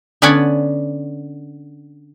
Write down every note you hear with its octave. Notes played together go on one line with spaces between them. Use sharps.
D3 B3 C#4 D5 F#5 G#5